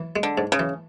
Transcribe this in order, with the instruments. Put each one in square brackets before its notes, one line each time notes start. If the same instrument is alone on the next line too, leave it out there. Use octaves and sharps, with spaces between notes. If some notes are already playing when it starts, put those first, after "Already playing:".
Already playing: [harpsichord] E3
G#3
[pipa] D3
[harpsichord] G#2
[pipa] C#3
[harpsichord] E3